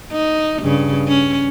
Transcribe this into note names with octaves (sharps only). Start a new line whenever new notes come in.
D#4
G2 C#3
C#4